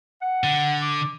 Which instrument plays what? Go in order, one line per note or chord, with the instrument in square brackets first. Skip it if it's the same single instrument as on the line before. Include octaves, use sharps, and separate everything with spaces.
[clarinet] F#5
[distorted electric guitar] D3
[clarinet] D6